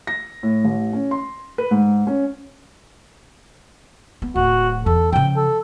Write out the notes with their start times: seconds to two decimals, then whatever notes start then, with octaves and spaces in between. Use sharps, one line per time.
0.07 A#6
0.43 A2
0.64 A1
0.93 C#4
1.11 C6
1.58 B4
1.71 G#2
2.07 C#4
4.22 B3
4.36 D1 F#4
4.86 E2 A4
5.13 C#3 F3 G5
5.36 A4